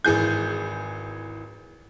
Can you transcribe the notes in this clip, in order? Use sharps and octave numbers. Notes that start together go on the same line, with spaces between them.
G#1 E3 G#4 G6